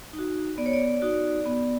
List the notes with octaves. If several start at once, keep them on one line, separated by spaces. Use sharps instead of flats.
D#4
F#4
B3 D5
C#5
D5
D#4 F#4
B3